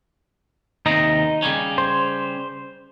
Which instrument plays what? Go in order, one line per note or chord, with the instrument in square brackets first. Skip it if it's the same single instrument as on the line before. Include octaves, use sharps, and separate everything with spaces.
[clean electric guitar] D#2 C3 A#5 [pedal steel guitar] D#4 D#5
[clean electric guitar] C#3 G3 C#4
[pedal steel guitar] C5